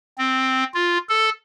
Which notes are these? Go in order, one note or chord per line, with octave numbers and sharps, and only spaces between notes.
C4
F4
A4